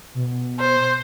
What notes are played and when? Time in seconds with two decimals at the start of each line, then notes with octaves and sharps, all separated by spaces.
0.15 B2
0.60 C5